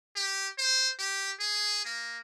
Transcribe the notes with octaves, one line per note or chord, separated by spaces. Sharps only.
G4
C5
G4
G#4
A#3